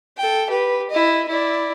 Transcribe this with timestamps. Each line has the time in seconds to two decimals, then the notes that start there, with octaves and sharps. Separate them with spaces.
0.18 A4 G5
0.49 G4 B4
0.90 E4 D#5
1.28 E4 D5